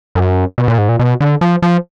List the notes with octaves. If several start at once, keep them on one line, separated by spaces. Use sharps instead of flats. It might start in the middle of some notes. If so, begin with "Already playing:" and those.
F#2
B2
A#2
G#2
A#2
B2
D3
F3
F3